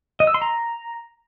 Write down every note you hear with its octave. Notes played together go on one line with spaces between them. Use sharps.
D#5
E6
C6
A#5